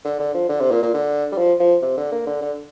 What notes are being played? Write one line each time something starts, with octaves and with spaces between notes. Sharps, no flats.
D3
D3
F3
D3
C3
A#2
A#2
D3
G3
F3
F3
C3
D3
A#3
D3
D3